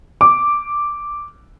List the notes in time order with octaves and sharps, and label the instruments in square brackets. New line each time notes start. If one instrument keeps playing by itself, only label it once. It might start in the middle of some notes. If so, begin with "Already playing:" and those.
[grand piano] D6